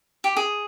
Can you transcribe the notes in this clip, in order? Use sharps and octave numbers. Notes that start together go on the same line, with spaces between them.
G4
G#4